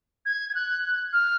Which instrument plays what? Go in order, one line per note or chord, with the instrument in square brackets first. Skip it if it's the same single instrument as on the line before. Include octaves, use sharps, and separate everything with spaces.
[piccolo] G#6
G#6
F#6
F6